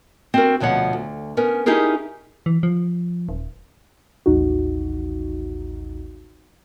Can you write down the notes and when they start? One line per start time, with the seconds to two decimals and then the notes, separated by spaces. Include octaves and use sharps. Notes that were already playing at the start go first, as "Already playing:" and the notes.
0.34 C4 F#4 A#4
0.60 D2 B2 F3 C#5 F#5
0.93 D2
1.37 B3 C#4 A#4
1.66 C#4 D#4 E4 G4 G#4 A#4
2.46 E3
2.63 F3
3.29 D#1
4.26 A1 D#2 D#4 F#4